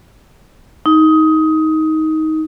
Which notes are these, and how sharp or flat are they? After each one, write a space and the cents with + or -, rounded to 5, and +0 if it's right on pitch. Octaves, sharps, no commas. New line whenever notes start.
D#4 +15